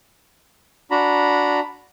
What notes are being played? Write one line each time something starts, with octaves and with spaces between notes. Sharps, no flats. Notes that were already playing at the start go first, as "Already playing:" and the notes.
D4 F#4 A#5 B5